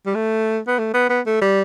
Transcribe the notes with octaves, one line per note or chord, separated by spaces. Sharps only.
G3
A3
B3
A3
B3
B3
A3
G3